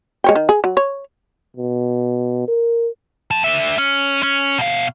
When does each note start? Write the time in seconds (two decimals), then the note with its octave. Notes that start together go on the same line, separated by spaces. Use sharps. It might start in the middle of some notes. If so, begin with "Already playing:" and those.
0.24 G#3 C#5 G5
0.35 D#3
0.49 G#4
0.64 F#3
0.77 C#5
1.57 B2
2.48 A#4
3.31 F2 A5
3.44 D3 E5
3.78 C#4
4.23 C#4
4.58 B2 F5